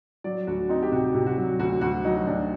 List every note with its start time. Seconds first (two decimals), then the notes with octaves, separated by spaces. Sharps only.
0.24 F#3 D5
0.47 D2 F#4
0.69 C4 D#4
0.83 G4
0.92 C3 F#4
1.14 C3
1.26 F#4
1.37 F#3
1.59 D2 F#4
1.81 D2 F#4
2.05 F#3 D#4
2.26 D2 D4